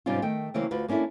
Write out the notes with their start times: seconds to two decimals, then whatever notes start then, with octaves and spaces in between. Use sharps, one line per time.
0.06 G#2 C3 G3 C#4 D#4 F4
0.22 D#3 A3 G5
0.54 C#3 E3 F#3 A#3 C5
0.71 D2 F4 F#4 B4
0.88 A#3 C#4 D4 E4 A4